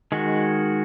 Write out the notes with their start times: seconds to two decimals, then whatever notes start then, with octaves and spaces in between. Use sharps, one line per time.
0.12 D#3 G#3 F#4